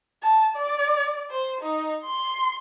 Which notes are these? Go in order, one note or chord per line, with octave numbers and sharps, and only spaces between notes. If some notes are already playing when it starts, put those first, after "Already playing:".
A5
D5
C5
D#4
C6